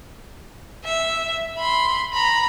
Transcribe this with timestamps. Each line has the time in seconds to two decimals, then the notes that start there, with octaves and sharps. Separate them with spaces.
0.84 E5
1.58 B5 C6
2.14 A#5 B5